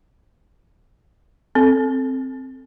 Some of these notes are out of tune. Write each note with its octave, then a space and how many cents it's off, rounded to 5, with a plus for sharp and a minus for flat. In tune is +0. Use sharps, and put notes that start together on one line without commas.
C4 +5 A4 +0